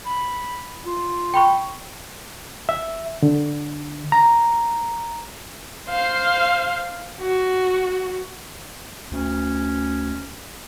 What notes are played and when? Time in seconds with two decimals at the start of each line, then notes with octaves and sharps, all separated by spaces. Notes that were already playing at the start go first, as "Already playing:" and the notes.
0.06 B5
0.86 F4
1.34 G5 B5 C#6
2.69 E5
3.23 D3
4.12 A#5
5.89 C5 F5
7.21 F#4
9.12 D2 C#4